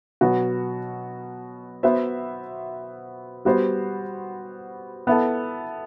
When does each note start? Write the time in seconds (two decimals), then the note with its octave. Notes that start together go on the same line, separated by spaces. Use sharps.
0.21 B2 F#3 B3 F#4
1.83 B3 F#4 C5 E5
3.45 G3 B3 F#4 C5
5.07 B3 E4 A4